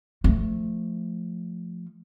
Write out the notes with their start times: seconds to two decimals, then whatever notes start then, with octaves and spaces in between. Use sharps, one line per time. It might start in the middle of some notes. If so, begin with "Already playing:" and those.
0.24 F3 A3